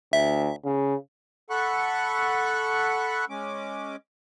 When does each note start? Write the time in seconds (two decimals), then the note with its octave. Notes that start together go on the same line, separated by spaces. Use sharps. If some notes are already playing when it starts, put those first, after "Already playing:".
0.13 D2 E5
0.65 C#3
1.50 A4 F#5 B5 C#6 F#6
3.29 G#3 C#4 D6